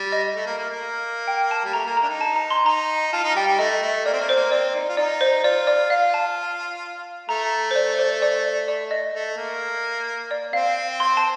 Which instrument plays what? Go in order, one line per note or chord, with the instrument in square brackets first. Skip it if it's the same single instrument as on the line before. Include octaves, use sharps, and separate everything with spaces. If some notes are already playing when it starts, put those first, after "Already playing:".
Already playing: [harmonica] G3
[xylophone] D#5
[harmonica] A3
A#3
A#3
A#3
[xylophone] G5
A5
[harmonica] G3
[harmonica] A3 [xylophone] A#5
[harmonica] A#3
[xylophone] A#5
[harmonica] D4
D#4
[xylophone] A5
A#5
C6
[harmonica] D#4 [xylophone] A#5
[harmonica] F4 [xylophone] A5
[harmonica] D#4
[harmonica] G3 [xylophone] G5
[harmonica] G3
[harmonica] A3 [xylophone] D#5
[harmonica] A3
[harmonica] A#3 [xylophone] D5
[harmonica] C4
A#3
[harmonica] C4 [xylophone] C5
[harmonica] A#3
[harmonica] C4 [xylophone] D5
[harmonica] D#4
F4
[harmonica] D#4 [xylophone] D5
[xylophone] C5
[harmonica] F4 [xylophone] D5
[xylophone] D5
[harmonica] F4 [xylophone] F5
[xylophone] A5
[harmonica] A3 [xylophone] A#5
[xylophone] C5
D5
C5
D5
D5
D#5
[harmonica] A3
A#3
[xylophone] D5
[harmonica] C4 [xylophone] F5
[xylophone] C6
A5